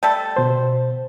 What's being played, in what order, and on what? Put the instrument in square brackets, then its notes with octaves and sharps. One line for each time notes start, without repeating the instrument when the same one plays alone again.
[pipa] G3 A3 A4
[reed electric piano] B2 C5